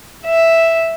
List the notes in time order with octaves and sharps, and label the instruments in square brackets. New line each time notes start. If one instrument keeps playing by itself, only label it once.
[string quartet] E5